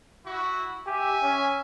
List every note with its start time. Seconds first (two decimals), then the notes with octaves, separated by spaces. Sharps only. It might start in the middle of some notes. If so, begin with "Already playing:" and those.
0.24 E4 F#4
0.86 G4 E5 G#5
1.23 C#4